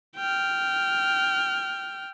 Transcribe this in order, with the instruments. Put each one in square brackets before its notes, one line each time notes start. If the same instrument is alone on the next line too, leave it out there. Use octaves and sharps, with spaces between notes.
[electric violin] G5 F6